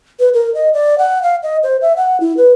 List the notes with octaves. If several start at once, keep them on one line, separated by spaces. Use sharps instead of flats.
B4
A#4
D#5
D5
F#5
F5
D#5
C5
E5
F#5
E4
B4